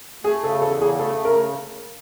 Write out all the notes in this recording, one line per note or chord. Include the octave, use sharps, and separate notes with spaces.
A3 G#4
C#3 A4
E2 A4
C#3 G#4
A3 A4
C#3
A#4